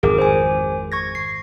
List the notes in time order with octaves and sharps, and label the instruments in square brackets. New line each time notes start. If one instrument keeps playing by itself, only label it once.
[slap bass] G#1 F2 [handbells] G#4 A#4 D6
[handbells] C5 G#5
C#6 G#6 A#6
C7